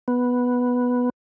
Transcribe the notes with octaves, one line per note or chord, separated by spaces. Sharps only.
B3